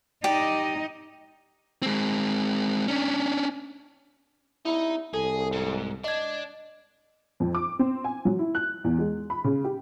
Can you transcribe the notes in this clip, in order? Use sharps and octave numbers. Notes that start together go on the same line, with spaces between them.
D#4 G4 D5 D#5
G#3 C4
C#4 D4
D#4 E4
C2 G#4 A4
G#2
D4 D#5 G#6
F2
D6
C4
G#5
F#3
E4
F#6
E2
G#3
B5
C#3
G4